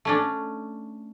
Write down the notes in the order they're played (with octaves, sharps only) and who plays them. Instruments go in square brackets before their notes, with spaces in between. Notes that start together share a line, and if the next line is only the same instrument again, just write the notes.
[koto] A3 C#4 D4